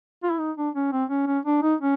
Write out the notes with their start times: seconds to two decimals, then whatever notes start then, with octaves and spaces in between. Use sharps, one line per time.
0.23 F4
0.31 E4
0.39 D#4
0.57 D4
0.75 C#4
0.92 C4
1.10 C#4
1.27 C#4
1.45 D4
1.62 D#4
1.81 C#4